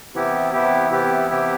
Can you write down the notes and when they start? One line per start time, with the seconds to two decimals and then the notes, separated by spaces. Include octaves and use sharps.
0.14 C3 E3 B3 E4 G4
0.53 C3 E3 B3 E4 G4
0.91 C3 E3 B3 E4 G4
1.30 C3 E3 B3 E4 G4